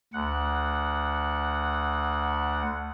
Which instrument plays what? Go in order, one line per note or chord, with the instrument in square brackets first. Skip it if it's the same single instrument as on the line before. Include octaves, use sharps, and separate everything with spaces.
[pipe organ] D2 F#5